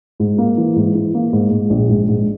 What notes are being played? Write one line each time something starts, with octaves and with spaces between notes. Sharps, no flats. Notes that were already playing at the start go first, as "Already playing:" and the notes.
G#2
A#3
E3
G#2
E3
A#3
G#2
G#2
A#1
G#2
G#2